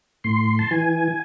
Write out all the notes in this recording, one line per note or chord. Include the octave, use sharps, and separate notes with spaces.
A2 C6
A5
E3 G#5